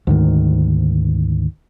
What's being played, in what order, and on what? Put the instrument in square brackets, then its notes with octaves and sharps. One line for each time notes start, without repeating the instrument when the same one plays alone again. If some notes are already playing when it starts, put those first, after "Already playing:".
[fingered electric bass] D2 G#2 D#3